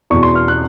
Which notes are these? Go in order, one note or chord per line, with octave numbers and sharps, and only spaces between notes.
E2 B2 C#6
C6
F6
F#6